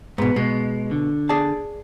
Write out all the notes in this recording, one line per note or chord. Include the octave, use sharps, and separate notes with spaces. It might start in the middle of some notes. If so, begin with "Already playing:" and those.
G#2 B2 B3
B2 G#3
D3
G#4 D5 A5